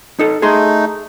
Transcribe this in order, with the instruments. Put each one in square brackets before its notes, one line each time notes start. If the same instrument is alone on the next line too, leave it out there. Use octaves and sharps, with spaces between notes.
[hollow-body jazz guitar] D#4 A4
[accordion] A3 D#4 [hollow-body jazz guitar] G#4 C6